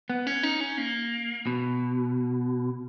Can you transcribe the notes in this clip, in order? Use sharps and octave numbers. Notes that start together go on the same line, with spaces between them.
B3
C#4
D#4
C#4
A#3
B2